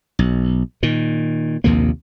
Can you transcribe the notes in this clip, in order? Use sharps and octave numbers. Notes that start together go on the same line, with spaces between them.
B1
A#2 D#3
A#1 D#2 C3 A#3